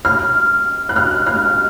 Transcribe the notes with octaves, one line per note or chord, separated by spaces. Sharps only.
F6
F#6
F6
F6